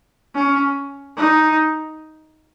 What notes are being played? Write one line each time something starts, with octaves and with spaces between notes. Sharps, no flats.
C#4
D#4